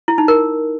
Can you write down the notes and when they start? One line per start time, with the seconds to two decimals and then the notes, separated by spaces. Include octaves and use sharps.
0.08 E4
0.18 D#4
0.28 A#4